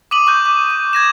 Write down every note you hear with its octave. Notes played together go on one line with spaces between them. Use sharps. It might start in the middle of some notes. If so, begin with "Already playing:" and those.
D6 D#6 D#7 F#7
C#6 F#6 G6
D6
C#6
G#6 A#6 E7